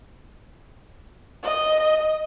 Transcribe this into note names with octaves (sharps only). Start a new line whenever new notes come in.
D#5